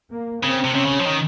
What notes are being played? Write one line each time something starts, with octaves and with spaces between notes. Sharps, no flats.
A#3
C#3 C4
C3
C3 C#4
C#3
F3
D#3